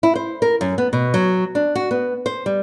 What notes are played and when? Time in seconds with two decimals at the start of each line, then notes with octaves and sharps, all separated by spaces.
0.03 E4
0.15 C5
0.42 A#4
0.61 F#2
0.78 B3
0.93 B2
1.14 F#3
1.55 D4
1.75 F#4
1.91 B3
2.26 C5
2.46 G3